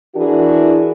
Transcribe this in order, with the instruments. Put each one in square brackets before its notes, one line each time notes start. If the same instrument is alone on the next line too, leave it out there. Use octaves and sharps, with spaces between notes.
[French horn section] E3 D4 E4 F#4 G#4 A#4